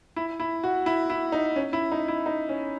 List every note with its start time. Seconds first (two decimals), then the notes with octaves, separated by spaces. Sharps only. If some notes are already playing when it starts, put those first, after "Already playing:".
0.16 E4
0.40 E4
0.64 F#4
0.86 E4
1.10 E4
1.32 D#4
1.56 C#4
1.73 E4
1.92 D#4
2.08 E4
2.26 D#4
2.49 C#4